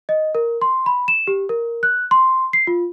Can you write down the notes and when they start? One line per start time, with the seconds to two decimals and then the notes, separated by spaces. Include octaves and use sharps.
0.09 D#5
0.35 A#4
0.62 C6
0.86 B5
1.08 E7
1.27 G4
1.49 A#4
1.83 F#6
2.11 C6
2.53 C7
2.67 F4